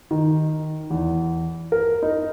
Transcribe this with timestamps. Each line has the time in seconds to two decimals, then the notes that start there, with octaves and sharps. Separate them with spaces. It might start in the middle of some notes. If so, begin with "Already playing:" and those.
0.11 D#3
0.90 E2
1.72 A#4
2.03 D#4